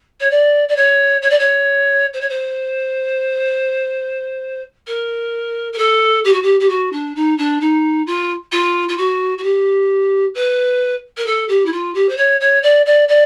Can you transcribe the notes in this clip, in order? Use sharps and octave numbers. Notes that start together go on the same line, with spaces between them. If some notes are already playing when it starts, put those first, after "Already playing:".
C#5
D5
D5
C#5
C#5
D5
C#5
C5
C#5
C5
A#4
A#4
A4
G4
F#4
G4
G4
F#4
D4
D#4
D4
D#4
F4
F4
F4
F#4
F#4
G4
B4
A#4
A4
G4
E4
F4
G4
C5
C#5
C#5
D5
D5
D5